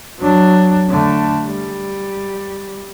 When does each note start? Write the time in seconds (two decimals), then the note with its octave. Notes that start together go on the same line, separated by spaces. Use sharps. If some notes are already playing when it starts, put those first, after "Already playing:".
0.19 F#3 D4
0.88 D3 A3
1.46 G3